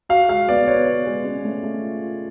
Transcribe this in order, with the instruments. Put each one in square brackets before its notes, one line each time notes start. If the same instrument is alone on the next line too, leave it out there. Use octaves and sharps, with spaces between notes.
[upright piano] F#4 [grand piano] F5
[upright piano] G#3 [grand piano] F5
[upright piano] B3 [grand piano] D5
[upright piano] B3 [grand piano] C#5
[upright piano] B3
G#3
C#4
A3
A3
F4
F4